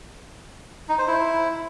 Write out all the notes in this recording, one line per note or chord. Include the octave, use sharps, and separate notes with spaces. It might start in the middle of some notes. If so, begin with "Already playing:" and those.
D#4
C5
E4